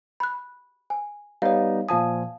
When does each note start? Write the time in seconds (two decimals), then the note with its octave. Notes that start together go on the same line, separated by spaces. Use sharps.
0.20 B5 F#6
0.90 G#5
1.42 G3 B3 D#4 C#5 F5
1.89 A#2 F3 F5 G#5 A5 D#6